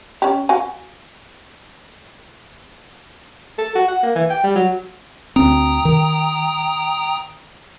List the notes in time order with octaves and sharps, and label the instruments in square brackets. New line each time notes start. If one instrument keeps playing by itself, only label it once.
[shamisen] C#4 G4
F#4 F5 G#5
[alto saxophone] A4
F#4
F#5
A#3
E3
G5
G3
F#3
[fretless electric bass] D2 C4 [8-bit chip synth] G5 A#5 D#6
[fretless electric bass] D#3